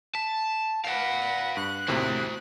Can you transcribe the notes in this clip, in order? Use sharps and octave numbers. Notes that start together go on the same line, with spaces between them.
A5 B6
B4 D5 F5 F#5 C7
G2 F#6
D#2 A2 C3 F#4 C5